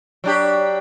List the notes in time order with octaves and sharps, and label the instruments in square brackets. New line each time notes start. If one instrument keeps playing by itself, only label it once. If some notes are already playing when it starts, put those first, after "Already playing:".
[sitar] F#3 D4 G4